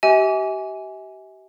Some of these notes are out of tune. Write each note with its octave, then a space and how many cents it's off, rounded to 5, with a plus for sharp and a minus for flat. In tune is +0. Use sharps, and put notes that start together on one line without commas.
G4 -35 E5 -40 G#5 +0